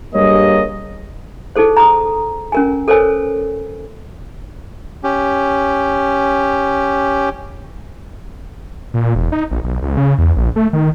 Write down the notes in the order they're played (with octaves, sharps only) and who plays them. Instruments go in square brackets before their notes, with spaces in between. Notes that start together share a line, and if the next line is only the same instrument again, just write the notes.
[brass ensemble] G2 G3 A#3 G#4 C#5 D#5
[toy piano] D#4 G#4 A4 C5
A#5 D#6
C#4 A#4 G#5
A4 A#4 C5 C#5 G#5
[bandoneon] C#4 G4
[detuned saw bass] A#2
E1
D#4
A#1
B1
C#2
C#3
E2
A#1
A3
D#3